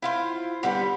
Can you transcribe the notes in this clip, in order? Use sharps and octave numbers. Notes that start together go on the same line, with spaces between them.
E4 F4 C5
D3 G3 B3 D4